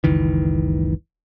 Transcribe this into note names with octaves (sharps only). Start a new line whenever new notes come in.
F#1 C#2 D#3 E3